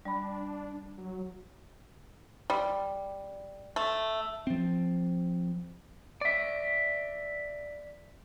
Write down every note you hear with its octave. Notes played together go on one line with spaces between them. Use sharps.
G3 D4 B5
F#3
G3
A3
F3 C4
D5 E5